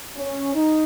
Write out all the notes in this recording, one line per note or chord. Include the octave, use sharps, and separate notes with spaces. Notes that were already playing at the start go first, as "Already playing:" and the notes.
C#4
D#4